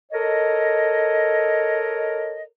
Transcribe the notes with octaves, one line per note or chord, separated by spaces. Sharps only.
A4 A#4 C#5 D#5